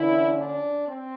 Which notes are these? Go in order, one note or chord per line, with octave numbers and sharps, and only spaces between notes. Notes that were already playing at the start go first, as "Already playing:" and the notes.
Already playing: D3 E3 F3 A#3 C#4 E4
D4
C4